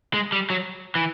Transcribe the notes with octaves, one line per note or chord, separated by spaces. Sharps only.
G#3
G3
F#3
E3